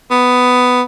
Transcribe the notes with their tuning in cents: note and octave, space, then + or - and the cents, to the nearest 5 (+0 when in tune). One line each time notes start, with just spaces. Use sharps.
B3 +10